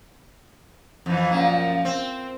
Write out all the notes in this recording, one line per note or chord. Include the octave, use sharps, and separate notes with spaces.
F2 E3
F#2 A#2 F3
C4